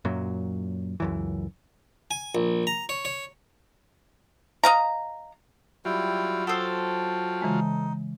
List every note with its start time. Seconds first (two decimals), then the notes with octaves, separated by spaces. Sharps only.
0.05 F#2 A#2 F#3
1.00 C#2 F#2 E3
2.11 G#5
2.35 A#1
2.67 A#5
2.89 C#5
3.05 C#5
4.64 D#5 F5 A#5
5.85 F#3 G3 E4 F4 G5
6.47 A4 C5 F#5 G5 D#6 E6
7.42 C#3 E3 G#3 D#4